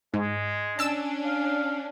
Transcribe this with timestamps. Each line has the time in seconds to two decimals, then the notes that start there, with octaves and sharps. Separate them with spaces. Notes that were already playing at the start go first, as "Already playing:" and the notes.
0.14 G#2 G#3
0.79 C#4 D4 A5 E6 E7
1.24 F5